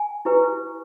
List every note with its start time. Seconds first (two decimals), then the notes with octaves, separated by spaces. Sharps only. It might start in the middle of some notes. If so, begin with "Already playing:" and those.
Already playing: G#5
0.25 E4 G4 B4